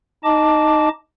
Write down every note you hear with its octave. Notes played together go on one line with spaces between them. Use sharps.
D#4 D#5 A5 D6